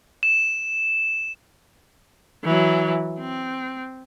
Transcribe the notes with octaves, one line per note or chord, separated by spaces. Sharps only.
E7
E3 F#3
C4